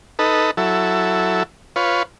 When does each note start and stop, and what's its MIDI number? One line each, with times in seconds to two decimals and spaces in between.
0.19 0.51 63
0.19 0.51 69
0.19 0.51 71
0.57 1.43 54
0.57 1.43 64
0.57 1.43 69
1.76 2.03 65
1.76 2.03 71
1.76 2.03 73